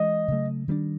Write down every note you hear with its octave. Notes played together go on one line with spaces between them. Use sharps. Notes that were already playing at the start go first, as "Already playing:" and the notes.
Already playing: E3 G#3 C#4 D#5
C#3 F#3 A3
D#3 G3 B3 D4